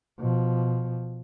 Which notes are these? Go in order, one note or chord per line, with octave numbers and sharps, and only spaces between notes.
B2 F3